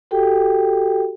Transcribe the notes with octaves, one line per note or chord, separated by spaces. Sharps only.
F#4 G4 A4 G5